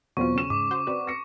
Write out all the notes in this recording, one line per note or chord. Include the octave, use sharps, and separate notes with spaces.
E2 B2 F#3 C4 F4 C5 C#6
C#3 C#4 E7
G#2 D6
F#4 C5
C4 F#4 B4 D5
A#6 C#7